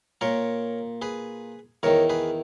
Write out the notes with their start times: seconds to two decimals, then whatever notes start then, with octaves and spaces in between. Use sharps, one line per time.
0.21 A#2 A#4 C#5
1.02 G#4 B4
1.83 E2 D#3 A#4 C#5
2.10 G#4 B4